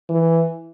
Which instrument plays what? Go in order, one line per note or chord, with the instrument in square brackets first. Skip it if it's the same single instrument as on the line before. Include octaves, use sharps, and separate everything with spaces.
[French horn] E3